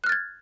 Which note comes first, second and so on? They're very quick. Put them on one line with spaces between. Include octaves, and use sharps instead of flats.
F#6 F6 A6 G#6